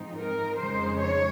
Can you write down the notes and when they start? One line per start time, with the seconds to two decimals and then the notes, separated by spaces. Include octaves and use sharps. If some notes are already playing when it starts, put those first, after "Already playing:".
Already playing: G#2 F3 C4 D#4
0.18 A#4
0.58 F2 C#3 G#3 D#4 C5
1.00 C#5